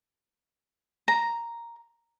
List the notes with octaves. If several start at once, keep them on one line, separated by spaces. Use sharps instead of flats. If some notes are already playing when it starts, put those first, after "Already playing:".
A#5